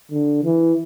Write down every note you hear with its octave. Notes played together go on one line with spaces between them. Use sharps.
D3
E3